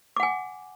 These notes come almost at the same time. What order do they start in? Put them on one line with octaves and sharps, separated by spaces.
D6 F#5 G#5